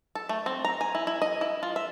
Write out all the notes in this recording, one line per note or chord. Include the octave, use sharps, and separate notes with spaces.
A4
A3
C4
A#5
G#5
E4
E4
D#5
E4
F4
E5